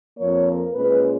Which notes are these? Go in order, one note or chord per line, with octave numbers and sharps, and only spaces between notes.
F2 F3 A#3 C#5
A#4
A#2 G#3 C#4 B4